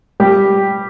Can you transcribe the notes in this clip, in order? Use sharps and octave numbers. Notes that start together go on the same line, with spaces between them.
G3 G4